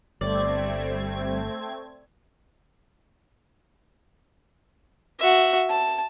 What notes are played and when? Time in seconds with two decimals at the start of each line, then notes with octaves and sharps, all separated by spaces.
0.21 G1 G3 A3 C4 D5 G#6
5.20 F#4 E5
5.69 A5